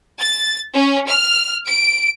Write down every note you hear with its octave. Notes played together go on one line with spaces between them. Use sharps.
A6
C#4
F6
D7